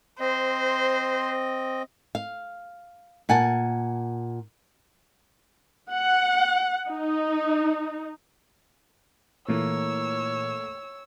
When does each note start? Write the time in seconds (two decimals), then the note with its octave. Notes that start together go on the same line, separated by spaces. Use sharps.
0.20 C4 C5 D#5
2.15 F5
3.29 A#2 F#5 G#5 A5
5.91 F#5
6.90 D#4
9.48 A#2 E3 A3 A#3 C#5 E6